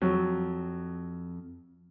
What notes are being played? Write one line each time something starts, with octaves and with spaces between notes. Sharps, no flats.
F2 F#3